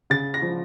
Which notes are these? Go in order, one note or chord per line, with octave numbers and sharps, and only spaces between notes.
C#3 A6
A#6
F3